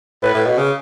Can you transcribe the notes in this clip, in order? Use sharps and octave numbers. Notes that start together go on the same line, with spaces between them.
A2 B4
A2
B2
C#3